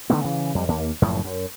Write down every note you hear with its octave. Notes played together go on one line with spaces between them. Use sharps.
D3 D#3 A3 B3
C#3 E3
F2 G3
D#2 A#3
F#1 F#2 A2 F3
F#2